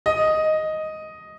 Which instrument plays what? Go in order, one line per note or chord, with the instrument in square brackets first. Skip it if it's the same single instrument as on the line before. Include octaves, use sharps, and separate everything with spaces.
[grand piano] D#5